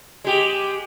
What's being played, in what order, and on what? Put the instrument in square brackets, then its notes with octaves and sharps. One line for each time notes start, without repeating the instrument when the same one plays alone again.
[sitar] G#3 G4